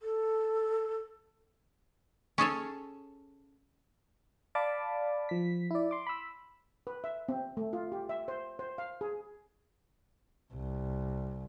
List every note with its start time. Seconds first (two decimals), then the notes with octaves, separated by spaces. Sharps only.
0.01 A4
2.38 C#4 G#4 A4 C#5
4.55 D5 F5 A5 B5 D6
5.29 F3 B6
5.71 E4 D5
5.91 C6 D6
6.07 B5 E6
6.87 B4
7.04 E5
7.29 C4
7.57 A3
7.73 F4
7.92 G4
8.09 E5
8.28 C5
8.59 C5
8.78 F5
9.01 G#4
10.54 C2